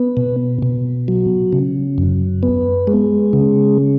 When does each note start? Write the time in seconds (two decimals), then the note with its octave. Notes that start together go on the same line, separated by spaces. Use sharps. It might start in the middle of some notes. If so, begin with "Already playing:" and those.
Already playing: B3
0.17 B2
0.62 B2
1.08 F#3
1.53 C#3
1.98 F#2
2.43 B3
2.87 G#3
3.33 C#3